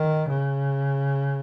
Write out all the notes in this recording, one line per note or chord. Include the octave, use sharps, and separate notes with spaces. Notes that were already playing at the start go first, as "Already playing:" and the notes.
Already playing: D#3
C#3